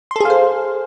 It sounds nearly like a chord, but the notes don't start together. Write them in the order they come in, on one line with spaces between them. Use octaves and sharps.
C6 A4 G#4 F5 C5